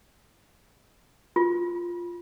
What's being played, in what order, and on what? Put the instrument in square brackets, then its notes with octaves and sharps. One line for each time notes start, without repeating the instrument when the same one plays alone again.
[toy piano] F4